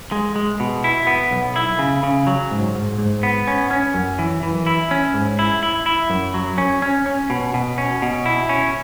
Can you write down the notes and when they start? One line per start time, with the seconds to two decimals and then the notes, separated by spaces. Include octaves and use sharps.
0.12 G#3
0.36 G#3
0.60 B2
0.84 E4
1.07 B3
1.31 B1
1.56 E4
1.79 C#3
2.03 C#3
2.27 F#3
2.51 G#2
2.75 G#2
2.98 G#2
3.23 B3
3.47 C#4
3.71 C#4
3.94 F#2
4.19 E3
4.43 E3
4.67 E4
4.91 C#4
5.14 G#2
5.39 E4
5.63 E4
5.86 E4
6.10 F#2
6.34 F#3
6.58 C#4
6.82 C#4
7.06 C#4
7.30 B2
7.54 B2
7.78 C#4
8.02 B2
8.26 E4
8.49 C#4